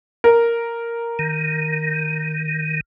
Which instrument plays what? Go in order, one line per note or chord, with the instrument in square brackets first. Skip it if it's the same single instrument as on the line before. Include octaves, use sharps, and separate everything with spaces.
[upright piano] A#4
[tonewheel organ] D#3